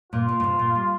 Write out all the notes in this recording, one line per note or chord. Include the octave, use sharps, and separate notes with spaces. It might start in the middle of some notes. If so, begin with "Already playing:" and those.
A#2 F4
A#2
A#2
C3
A#2
G3